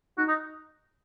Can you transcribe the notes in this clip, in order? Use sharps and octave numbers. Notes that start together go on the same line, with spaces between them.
D#4 F#4
D#4